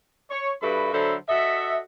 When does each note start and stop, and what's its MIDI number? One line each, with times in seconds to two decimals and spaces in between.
0.30 0.50 73
0.62 0.90 43
0.62 0.90 66
0.62 0.90 69
0.62 0.90 76
0.62 0.90 83
0.93 1.15 50
0.93 1.15 54
0.93 1.15 69
0.93 1.15 72
0.93 1.15 76
0.93 1.15 83
1.29 1.78 66
1.29 1.78 69
1.29 1.78 75
1.29 1.78 76